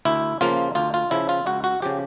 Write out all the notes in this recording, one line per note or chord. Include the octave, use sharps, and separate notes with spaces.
D2 E4
C#3 F3 A#3 F4
D2 F4
F4
C#3 F3 E4
F4
C#2 F#4
F#4
C#3 F3 G4